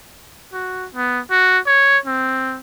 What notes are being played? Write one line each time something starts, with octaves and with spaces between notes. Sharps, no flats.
F#4
B3
F#4
C#5
C4